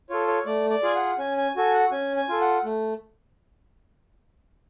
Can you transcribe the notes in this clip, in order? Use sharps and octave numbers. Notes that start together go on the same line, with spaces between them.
F4 A4 C#5
C#5
A3 D5
D5
F4 G#4 G#5
F#5
C#4 G#5
G#5
F#4 A4 G#5
F#5
C#4 G#5
G#5
F4 A4
F#5
A3